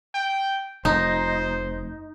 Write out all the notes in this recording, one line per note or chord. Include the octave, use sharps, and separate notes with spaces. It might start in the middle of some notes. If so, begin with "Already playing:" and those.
G5
F1 D#4 C5